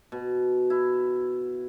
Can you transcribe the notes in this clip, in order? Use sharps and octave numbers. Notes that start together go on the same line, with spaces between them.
B2
E4